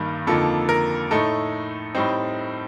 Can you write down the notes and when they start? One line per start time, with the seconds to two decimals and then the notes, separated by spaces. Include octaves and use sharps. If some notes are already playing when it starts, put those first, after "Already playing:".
Already playing: G2 D#3 G3 A#3 D#4
0.27 F2 D3 F3 A#3 D#4 A4
0.69 A#4
1.11 A2 A3 D#4 A4
1.95 A2 G3 C4 D#4